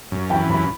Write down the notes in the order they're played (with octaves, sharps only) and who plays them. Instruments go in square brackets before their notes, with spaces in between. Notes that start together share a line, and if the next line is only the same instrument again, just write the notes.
[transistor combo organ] F#2
[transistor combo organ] E3 [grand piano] G5
[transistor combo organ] F#2 [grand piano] B5